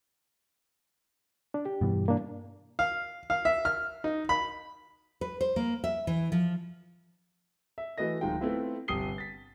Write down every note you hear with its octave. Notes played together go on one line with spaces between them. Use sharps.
D4
G4
G2 B2 E3
A#3 D4
F5
F5
E5
F6
D#4
B5
B4
C5
A#3
E5
E3
F3
E5
E3 A3 F#4 B4 D#5 A#6
D1 D#3 G#3 D#4 F4 G5
A3 B3 C4 E4 F4
G1 C3 G4 D#6 C7 G7
A6 B6